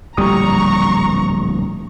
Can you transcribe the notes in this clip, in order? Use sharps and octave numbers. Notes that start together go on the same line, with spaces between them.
D1 A#1 A2 G3 A#5 C#6 D#6